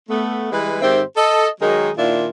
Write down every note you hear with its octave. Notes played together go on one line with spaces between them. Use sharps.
A3 B3
E3 G3 G#3 B4
G#2 D#3 C4 G4 C5 E5
A4 D#5
D#3 F#3 G#3 D#4 G#4 A#4
A#2 D#3 D4 E4 F4